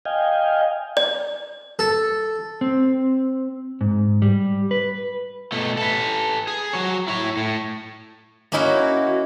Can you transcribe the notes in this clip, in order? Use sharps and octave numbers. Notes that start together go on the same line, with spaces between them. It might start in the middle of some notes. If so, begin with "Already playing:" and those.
D#5 F5 G5 G#5
D5
A4
C4
G#2
G3
B4
B2 A3
A4 B4
G#4
F#3 C#5
E4 C#5
A2
A#3 C#4 D#4 E4 F#4